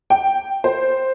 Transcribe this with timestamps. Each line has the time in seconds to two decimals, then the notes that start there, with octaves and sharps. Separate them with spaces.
0.10 G5
0.64 C5